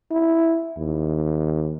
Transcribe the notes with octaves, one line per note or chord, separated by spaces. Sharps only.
E4
D#2